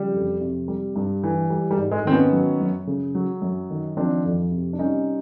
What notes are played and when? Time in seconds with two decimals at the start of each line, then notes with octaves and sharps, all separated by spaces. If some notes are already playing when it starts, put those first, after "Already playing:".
Already playing: C#3 F3 G3
0.14 F2
0.41 C3
0.68 G3
0.96 G2
1.24 E3
1.50 G3
1.71 G3
1.78 G#2
1.91 G#3
2.05 D#3 C4
2.12 B3 C#4
2.32 F#3
2.61 F#2
2.87 C#3
3.15 F#3
3.42 F#2
3.70 D#3
3.97 F3 C4 D4
4.25 F2
4.51 C3
4.73 D4
4.79 G3 C#4 D#4